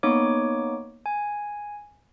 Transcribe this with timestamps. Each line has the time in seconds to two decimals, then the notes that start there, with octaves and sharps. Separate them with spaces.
0.03 A#3 B3 D#4 C#5 D6
1.06 G#5